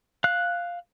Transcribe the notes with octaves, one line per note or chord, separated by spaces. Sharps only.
F5 F#6